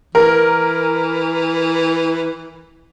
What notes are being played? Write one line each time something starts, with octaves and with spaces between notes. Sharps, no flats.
E3 A#4